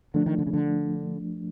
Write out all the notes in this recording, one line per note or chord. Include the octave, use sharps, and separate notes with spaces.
D3 F3 A3 D4
D#3
D3
C#3
D3